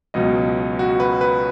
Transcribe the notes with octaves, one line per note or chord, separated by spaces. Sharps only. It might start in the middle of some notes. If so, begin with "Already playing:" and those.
C#2 B2 F#3 D#5
F#4
B4
B4